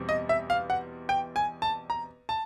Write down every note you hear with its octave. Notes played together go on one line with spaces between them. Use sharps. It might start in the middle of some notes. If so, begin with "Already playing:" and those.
Already playing: E2 B2 G3 C4
D#5
E5
F5
F#5
G5
G#5
A5
A#5
A5